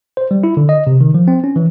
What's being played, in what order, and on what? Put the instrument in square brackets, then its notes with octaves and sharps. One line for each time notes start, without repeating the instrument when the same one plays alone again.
[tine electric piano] C5
G3
E4
D3
D#5
C3
D#3
F3
C4
C#4
E3